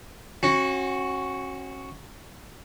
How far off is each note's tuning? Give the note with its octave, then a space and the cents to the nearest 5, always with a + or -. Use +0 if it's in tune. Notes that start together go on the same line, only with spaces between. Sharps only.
C#4 -35 F#4 +0